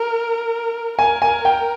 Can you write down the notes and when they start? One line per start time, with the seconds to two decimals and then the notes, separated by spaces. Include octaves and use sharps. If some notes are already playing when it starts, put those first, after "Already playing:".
Already playing: A#4
0.98 A#4 G#5
1.22 G#5
1.45 G5